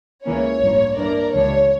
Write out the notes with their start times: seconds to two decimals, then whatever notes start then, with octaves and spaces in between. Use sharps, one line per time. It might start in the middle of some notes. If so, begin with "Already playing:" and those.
0.25 C#2 C#3 E3 A#3 C#4 C#5
0.60 A1 G2 F3 A#3
0.96 G2 E3 A#3 D4 A#4 D5
1.33 C#2 C#3 E3 G3 D4 C#5